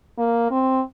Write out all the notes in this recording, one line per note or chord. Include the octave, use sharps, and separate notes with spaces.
A#3
C4